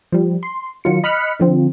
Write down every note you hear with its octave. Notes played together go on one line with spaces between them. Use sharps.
F3 G3
C6
D#3 F#3 F4 C#7
D#5 B5 F6 F#6 B6 C#7
D3 F3 C4